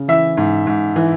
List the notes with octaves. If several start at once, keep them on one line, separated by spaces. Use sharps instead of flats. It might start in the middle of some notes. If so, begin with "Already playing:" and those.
Already playing: C#3
E3 E5
G#2
G#2
E3